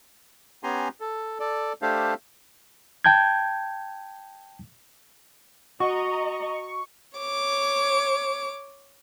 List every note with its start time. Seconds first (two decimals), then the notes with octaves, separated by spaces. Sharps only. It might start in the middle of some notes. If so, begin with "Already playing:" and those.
0.64 B3 C#4 G4 G#5 A#5 C6
1.00 A4
1.40 A4 D5
1.82 A3 D4 G4 A4 C5 F5
3.04 G5 A5 G6 G#6
5.80 F#4 D#5 A#5 C#6
7.18 C#5 D6